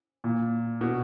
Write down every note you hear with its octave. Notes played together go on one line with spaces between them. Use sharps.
A#2
B2